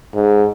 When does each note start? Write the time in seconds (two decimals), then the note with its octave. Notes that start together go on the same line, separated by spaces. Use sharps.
0.15 G#2